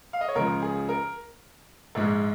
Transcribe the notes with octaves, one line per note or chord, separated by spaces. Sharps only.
F5
D#5
C#5
C#2 C#3 F3 A#4
G#4
A#4
A#1 G#2 G#3